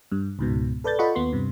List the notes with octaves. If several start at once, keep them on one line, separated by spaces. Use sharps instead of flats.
G2
C#2 G#2 B2
A4 B4 D5 G6 A6
F4 A4 D#5 F#5 B5 C#6
D#2 B3 C6
G2 C3